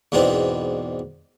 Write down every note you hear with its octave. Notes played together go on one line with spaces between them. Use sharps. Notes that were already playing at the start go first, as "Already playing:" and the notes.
E2 G#2 B2 C4 D4